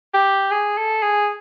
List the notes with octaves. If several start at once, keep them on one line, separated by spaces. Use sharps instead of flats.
G4
G#4
A4
G#4